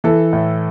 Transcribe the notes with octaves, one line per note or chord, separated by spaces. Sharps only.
E3 A4
A2